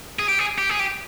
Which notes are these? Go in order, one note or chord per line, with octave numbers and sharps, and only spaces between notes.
G#4
G4
G#4
G4
G#4
G4